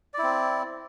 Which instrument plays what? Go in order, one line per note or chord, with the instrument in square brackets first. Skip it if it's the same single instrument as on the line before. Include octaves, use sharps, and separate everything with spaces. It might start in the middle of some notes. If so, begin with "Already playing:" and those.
[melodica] D5
E4
C4